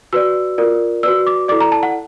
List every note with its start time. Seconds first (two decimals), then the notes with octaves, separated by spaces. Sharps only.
0.13 F#4 B4 D5 E6
0.58 F4 A#4 D5
1.03 F#4 B4 D5 E6
1.27 D6
1.48 E4 A4 D5 D6
1.61 A#5
1.72 A5
1.83 F#5